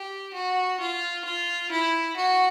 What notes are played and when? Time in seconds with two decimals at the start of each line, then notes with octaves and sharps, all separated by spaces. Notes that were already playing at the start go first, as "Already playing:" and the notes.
Already playing: G4
0.34 F#4
0.80 F4
1.25 F4
1.71 E4
2.17 F#4